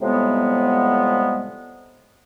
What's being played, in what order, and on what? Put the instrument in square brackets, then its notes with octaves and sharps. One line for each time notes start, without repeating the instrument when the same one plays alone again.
[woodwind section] A2 C3 F3 G3 G#3 B3